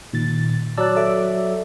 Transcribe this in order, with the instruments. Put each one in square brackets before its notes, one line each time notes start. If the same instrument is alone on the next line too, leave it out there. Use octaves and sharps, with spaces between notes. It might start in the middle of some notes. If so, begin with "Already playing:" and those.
[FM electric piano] A#2 D#3 A6
[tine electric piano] F#3 D5 E6 [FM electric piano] A5 F#6
[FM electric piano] A4 E5 D6